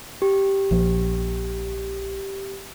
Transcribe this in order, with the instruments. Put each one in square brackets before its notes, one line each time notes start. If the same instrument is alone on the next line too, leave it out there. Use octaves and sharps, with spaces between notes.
[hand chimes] G4
[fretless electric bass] A#1 F3